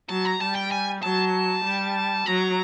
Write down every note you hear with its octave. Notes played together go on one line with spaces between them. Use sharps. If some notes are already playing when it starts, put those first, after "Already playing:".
F#3 A5
A#5
G3 A5
G5
G#5
F#3 A5
G3
F#3 A#5